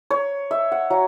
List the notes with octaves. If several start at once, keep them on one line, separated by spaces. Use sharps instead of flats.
C#5
E5
F#5
F#3